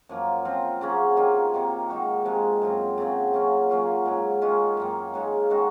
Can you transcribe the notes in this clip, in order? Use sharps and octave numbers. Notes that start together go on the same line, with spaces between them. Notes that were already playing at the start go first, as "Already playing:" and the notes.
F#2 F3 A#3
F3 C4 F4
C#3 F#3 A#3 C#4
C3 D#3 A#3 F4
C3 D#3 A#3
D#3 G#3 D#4 F#4
C3 F3 G#3
F#2 F3 C4
C#3 F#3 C4
A#2 F#3 C#4
A#2 F#3 C#4 F4
G#2 F#3 C#4
D#3 G#3 C#4 F4
F#2 D#3 A#3
C#3 G#3 D#4
D#3 G#3 C#4 F#4